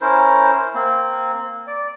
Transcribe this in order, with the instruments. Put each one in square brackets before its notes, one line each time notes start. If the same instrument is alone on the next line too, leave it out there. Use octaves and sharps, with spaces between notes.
[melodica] C#4 E4 A#4 C5
A#3 C4
D5